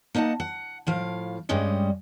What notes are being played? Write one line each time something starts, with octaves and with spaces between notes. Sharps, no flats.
A#3 D#4 D#5 F#5 A5
F#5
A2 F3 F5
G2 G3 G#3 C#4 D#5